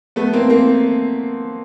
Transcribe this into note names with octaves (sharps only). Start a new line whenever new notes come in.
A3 B3
A#3 C4
A#3 C4